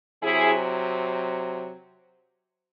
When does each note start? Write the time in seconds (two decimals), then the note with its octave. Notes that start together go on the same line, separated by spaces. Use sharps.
0.22 C3 F#3 E4 G#4